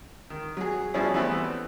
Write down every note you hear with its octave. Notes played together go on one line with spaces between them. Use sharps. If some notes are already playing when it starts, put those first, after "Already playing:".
D#3
F#3 G#4
B2 F3 G3 C#4 E4 G#4
E3 G3 A3 B3 C4